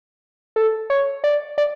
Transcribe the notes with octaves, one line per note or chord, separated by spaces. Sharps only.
A4
C#5
D5
D5